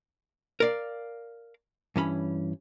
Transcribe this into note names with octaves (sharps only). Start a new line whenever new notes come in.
A#4 D5 F5
G2 E3 C#4 B5